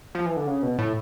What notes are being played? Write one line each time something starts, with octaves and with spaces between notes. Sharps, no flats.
F3
E3
D3
C#3
B2
A2